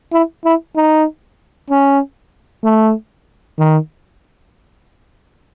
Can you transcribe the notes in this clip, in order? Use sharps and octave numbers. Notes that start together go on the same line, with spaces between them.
E4
E4
D#4
C#4
A3
D#3